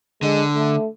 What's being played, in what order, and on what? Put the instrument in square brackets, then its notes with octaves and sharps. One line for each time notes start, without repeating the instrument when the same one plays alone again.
[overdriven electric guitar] D3 [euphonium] G#3
[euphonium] A3